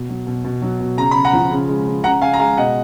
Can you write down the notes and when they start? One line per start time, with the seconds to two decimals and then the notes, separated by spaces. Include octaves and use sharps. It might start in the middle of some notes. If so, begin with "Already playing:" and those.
Already playing: B2
0.09 F#3
0.27 B2
0.44 B2
0.62 F#3
0.80 B2
0.97 C#3 A#5
1.11 C#3 B5
1.25 F#5 A#5
1.33 F3
1.51 C#3
1.69 G#3
1.86 C#3
2.04 C#3 F#5 A#5
2.22 C#3 F5 G#5
2.33 A#5
2.39 G#3 F5 G#5
2.57 B2 D#5 F#5